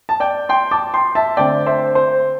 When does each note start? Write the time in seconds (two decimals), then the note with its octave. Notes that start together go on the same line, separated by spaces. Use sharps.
0.09 A5
0.20 D5 G5
0.49 G5 C6
0.71 A5 D6
0.94 G5 C6
1.15 E5 A5
1.37 D3 A3 C4 D5 G5
1.66 C5 E5
1.95 C5